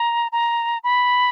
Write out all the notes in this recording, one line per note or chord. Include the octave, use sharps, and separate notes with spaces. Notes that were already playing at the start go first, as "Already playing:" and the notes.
Already playing: A#5
A#5
B5